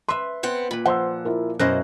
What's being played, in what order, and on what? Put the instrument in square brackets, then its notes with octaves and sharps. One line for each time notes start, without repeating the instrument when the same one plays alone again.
[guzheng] B4 E5 [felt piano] C6
[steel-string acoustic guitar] B3 C4 F#5
[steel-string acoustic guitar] A#2 [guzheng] B4 B5
[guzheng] F3 [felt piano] F#5 C6 E6
[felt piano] E4 F4 A#4
[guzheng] F#2 E4 F5 [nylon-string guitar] B2 C5 D#5 [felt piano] F#6 A#6